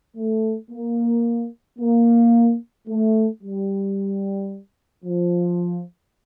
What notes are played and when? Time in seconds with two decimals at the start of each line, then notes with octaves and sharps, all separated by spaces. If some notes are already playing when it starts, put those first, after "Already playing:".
0.16 A3
0.71 A#3
1.79 A#3
2.88 A3
3.42 G3
5.05 F3